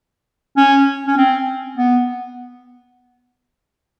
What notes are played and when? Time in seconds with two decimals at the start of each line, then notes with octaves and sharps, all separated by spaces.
0.57 C#4
1.07 C#4
1.17 C4
1.78 B3